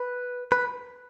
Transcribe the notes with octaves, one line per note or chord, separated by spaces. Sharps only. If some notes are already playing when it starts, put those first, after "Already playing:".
Already playing: B4
B4